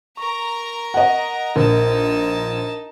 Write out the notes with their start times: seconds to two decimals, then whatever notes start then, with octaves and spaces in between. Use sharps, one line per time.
0.17 A#4 A#5 C#6
0.94 D#5 F#5
1.56 A#1 D#4 A#4 A5